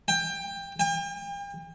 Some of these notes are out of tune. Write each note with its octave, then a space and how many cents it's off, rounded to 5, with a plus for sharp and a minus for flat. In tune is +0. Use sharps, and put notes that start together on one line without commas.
G5 +20
G5 +40